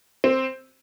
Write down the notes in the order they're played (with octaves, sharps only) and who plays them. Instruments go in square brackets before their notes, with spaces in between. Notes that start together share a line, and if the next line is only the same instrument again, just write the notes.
[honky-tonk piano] C4